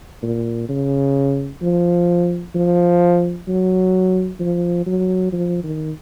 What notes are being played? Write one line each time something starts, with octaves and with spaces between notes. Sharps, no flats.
A#2
C#3
F3
F3
F#3
F3
F#3
F3
D#3